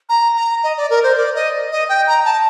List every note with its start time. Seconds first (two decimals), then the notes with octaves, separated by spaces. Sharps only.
0.09 A#5
0.37 A#5
0.64 D#5
0.77 D5
0.90 A#4
1.03 C5
1.17 D5
1.35 D#5
1.72 D#5
1.89 G5
2.07 A#5
2.25 A5